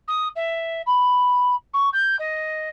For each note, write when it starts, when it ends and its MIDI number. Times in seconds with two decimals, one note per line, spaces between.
0.07 0.28 87
0.35 0.82 76
0.86 1.54 83
1.73 1.89 85
1.93 2.16 91
2.19 2.69 75